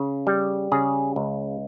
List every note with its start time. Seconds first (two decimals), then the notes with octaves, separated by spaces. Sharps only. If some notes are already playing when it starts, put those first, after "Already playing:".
Already playing: C#3
0.27 G3
0.72 C#3 G#4
1.16 C#2